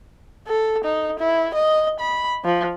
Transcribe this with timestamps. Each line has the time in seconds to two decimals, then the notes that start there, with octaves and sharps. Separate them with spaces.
0.47 A4
0.84 D#4
1.19 E4
1.54 D#5
2.00 B5
2.45 F3